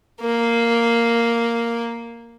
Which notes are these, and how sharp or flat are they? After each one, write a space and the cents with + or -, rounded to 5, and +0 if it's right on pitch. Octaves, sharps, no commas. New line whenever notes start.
A#3 -5